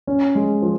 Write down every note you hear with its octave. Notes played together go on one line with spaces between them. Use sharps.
C#4
G#3
F3